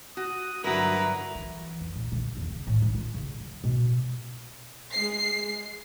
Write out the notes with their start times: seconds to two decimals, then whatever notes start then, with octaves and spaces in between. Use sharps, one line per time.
0.17 F#4 D#6
0.64 G2 D3 F#3 E4 F#4 A#4 B4 A#5
1.35 E3
1.81 F2
1.95 A#2
2.12 D3
2.37 E2
2.51 C#3
2.67 A2
2.82 E3
2.95 F4
3.14 C#3
3.40 F#3
3.64 B2
4.92 G#3 C7